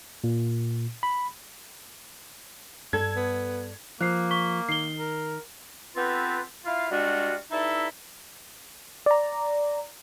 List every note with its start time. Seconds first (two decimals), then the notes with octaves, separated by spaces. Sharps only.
0.24 A#2
1.03 B5
2.93 G2 G3 A4 G#6
3.16 B3
4.01 F3 A#3 F#6 C7
4.31 C#6 B6 G7
4.69 D#3 C7 G7
4.98 A#4
5.95 B3 C4 F4 G4 A4 B4
6.65 E4 F4 F5
6.90 G3 G#3 D4 F4 F#4
7.51 G2 D#4 E4 A4 E5
9.06 D5 A#5